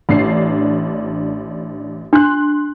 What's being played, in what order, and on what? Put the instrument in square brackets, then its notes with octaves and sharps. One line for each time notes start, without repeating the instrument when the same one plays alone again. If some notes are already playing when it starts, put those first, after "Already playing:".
[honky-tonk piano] A1 D4 C7
[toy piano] D4 [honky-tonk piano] C6 F#6